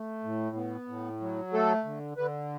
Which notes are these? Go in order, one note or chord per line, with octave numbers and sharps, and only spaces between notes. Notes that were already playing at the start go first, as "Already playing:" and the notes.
Already playing: A3
A2
B3
A2
F#3
A3 A4
D3
D3 B4